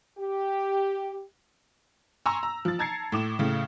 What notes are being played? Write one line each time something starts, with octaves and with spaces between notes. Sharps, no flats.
G4
G#5 A#5 C6 C#6 E6
A#5
F3 A6
A5 A#5 G#6 A6 C7 C#7
A2 D6 E7
A2 C#3